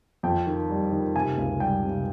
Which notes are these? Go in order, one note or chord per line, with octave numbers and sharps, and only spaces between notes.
F2 G5
D#3
G3
D#3
C3 G#5
C#2
G3 G5
C3